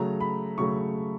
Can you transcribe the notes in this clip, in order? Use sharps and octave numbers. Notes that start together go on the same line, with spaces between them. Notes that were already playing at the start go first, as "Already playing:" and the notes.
Already playing: C#3 F#3 A3 A#5
B5
C#3 F#3 A3 C#6